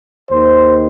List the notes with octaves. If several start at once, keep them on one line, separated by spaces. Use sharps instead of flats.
D#2 D#3 C5